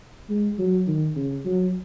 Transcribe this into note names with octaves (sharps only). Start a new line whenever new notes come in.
G#3
F#3
D#3
C#3
F#3